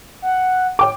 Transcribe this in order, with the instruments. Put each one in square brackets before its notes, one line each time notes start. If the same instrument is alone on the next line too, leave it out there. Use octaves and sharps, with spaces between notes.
[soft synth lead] F#5
[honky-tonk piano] C#5 G5 D6